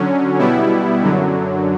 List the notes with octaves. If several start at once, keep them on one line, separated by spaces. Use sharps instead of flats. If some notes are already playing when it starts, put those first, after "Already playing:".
Already playing: D3 F#3 C#4
B2 G3 B3 E4
F#2 D3 F#3